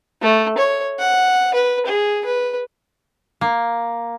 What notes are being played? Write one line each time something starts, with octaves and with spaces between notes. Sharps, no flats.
A3
C#5
F#5
B4
G#4
B4
A#3